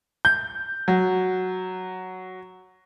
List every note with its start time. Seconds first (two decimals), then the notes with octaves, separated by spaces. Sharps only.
0.25 G6
0.88 F#3